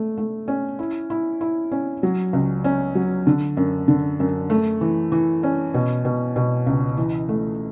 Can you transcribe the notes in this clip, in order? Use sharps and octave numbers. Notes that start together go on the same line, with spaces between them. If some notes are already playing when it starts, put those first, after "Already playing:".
Already playing: A3
A3
C#4
E4
E4
E4
C#4
F#3
C#2
C#4
F#3
D3
F#2
D3
F#2
A3
E3
E3
C#4
B2
B2
B2
C#2
E3
A3